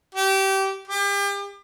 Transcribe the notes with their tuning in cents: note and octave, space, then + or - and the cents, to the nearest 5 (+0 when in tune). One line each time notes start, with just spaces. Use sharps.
G4 -25
G4 +35